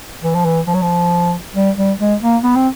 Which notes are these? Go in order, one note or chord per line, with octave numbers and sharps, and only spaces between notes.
E3
F3
E3
F3
F#3
F3
G3
G3
G#3
A#3
B3
C4